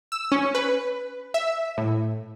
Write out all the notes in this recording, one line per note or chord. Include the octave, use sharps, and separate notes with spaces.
E6
C#4
B4
E5
A2